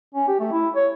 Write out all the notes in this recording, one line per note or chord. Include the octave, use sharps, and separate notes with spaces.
C#4
G4
A3
E4
C#5